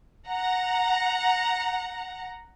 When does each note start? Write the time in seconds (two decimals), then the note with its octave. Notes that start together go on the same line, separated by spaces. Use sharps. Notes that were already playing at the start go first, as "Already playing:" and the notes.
0.28 F#5 A#5